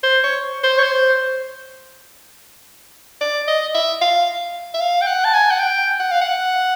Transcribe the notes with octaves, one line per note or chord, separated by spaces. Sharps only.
C5
C#5
C5
C#5
C5
D5
D#5
E5
F5
E5
F5
G5
F#5
A5
G#5
F#5
G5
F#5
F5
F#5